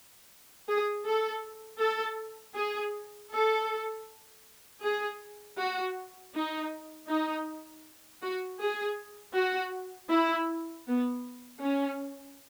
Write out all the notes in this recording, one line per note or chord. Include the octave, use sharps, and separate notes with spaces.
G#4
A4
A4
G#4
A4
G#4
F#4
D#4
D#4
F#4
G#4
F#4
E4
B3
C#4